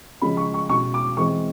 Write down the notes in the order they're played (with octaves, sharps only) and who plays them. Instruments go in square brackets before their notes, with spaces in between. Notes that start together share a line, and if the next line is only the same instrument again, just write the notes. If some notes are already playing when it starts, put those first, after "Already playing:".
[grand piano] C#3 F3 G#3 C#4 B5
C#6
C#6
B2 G#3 C#4 C#6
D6
E3 G#3 C4 C#6